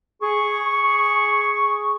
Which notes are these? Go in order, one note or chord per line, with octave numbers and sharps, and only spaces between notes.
G#4 C#6